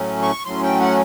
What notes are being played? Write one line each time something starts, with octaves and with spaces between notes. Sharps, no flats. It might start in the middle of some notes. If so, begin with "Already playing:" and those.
Already playing: A2 F#3 A3 C#4
C#6
A2 F#3 A3 C#4 C6
G5
F#5